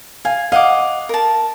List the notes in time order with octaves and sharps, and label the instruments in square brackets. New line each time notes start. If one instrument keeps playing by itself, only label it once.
[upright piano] F5 [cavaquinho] G#5
[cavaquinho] D#5 F#5 D6 [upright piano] F5
[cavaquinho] A#4 A5